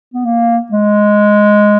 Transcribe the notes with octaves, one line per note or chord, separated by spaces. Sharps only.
B3
A#3
G#3